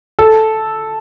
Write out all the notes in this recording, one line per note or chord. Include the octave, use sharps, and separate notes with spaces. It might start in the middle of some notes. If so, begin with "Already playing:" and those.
A4